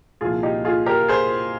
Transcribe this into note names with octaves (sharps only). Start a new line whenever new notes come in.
C2 A#2 F3 F4 G#4
D#4 G4
F4 G#4
G4 A#4
G#4 C5